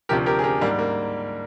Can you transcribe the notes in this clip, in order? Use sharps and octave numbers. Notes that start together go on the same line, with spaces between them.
D2 C3 F3 G4 A#4
G4 A#4
G#4
G4 A#4
G#2 G3 A#3 D4
A#3